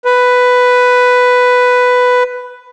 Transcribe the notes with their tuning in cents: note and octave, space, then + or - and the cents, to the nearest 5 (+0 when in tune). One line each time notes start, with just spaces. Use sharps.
B4 +5